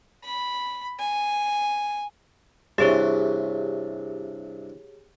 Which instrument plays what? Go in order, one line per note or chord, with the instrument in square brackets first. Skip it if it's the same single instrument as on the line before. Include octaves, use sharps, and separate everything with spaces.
[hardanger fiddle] B5
G#5
[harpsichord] G2 C3 E3 [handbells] G4 G#4 C#5